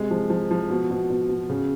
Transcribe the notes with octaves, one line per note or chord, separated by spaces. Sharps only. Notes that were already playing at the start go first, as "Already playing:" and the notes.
Already playing: C3 G#3
F3
F3
F3
B2
B2
B2
B2
C#3